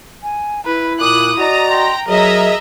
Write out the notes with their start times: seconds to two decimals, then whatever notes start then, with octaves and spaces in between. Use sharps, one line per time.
0.23 G#5
0.66 E4 B4
1.01 A#2 D6 D#6 F#6
1.37 F#4 D5 D#5 A#5
1.70 G5 C6
2.08 F#3 G#4 A#4 D#5 E5 A#5